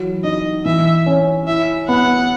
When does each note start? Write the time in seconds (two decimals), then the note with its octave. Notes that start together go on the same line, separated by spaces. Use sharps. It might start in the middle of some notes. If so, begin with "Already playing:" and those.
Already playing: E3 F#3
0.23 D#4 D#5
0.65 E3 E5
1.06 C#4
1.47 E4 E5
1.88 B3 F#5